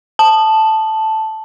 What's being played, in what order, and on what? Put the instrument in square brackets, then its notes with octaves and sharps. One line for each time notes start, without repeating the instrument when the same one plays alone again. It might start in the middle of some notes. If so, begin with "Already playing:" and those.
[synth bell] A5